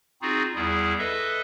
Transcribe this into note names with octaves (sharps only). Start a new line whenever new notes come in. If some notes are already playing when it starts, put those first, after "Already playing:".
C4 D#4 F4 F#4 G#4
E2 G3 E4 G#4
A4 B4 D#5 E5